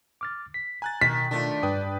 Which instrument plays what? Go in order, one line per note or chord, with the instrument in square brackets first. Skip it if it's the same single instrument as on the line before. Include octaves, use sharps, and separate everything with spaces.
[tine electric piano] D6 F6 A6
B6
[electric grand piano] G#5 F#6 A6 [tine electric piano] A#5
[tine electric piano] B2 [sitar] D#3 [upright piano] B6
[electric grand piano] D#3 A3 F4 [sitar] D4
[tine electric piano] G2 [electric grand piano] B4 G5 D#6